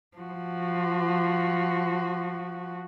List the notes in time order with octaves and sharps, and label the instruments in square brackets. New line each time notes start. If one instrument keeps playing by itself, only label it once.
[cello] F3 F#4